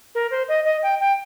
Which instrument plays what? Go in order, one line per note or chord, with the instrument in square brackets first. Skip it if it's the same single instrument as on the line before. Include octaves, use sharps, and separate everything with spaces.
[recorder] A#4
C5
D#5
D#5
G5
G5